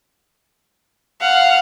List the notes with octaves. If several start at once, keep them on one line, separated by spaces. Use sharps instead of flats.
F5 F#5